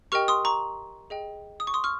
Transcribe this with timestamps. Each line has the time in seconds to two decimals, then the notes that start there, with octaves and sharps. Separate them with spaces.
0.12 G4 A#4 D#5 G5 C#6 F6
0.28 C6 D#6
0.45 A#5 C#6
1.10 G#4 D#5 G5
1.60 D#6
1.67 C#6
1.74 C6 D#6
1.84 C#6 F6